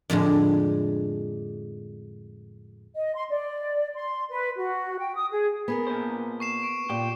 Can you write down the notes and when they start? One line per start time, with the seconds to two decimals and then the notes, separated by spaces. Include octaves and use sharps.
0.10 F2 A2 D3 G#3
2.95 D#5
3.15 C6
3.30 D5
3.94 C6
4.30 B4
4.57 F#4
4.98 G5
5.15 D#6
5.31 G#4
5.68 B3 G#4 A#4
5.87 A#2 C5
6.40 C#6 C7 E7
6.63 C#6 D7
6.90 A#2 G4